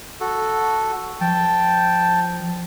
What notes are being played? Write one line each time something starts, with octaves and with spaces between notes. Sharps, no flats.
F#4 A4
F3 G5 A5